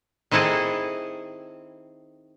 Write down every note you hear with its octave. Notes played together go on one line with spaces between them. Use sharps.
D#3 C4 E4 G#4 A4